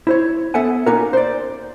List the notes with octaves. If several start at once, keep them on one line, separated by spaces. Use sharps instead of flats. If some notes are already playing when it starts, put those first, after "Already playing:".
E4 C5 C#5
B3 A4 E5 F#5 G#5
A#3 C#4 D#4 F4 F#4 A#4
C5 D5